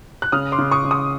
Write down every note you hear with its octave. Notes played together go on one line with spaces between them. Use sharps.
F#6
C#3 D#6 F6
C6 D6
C#3
C#6 D#6
C#3
C#6 D#6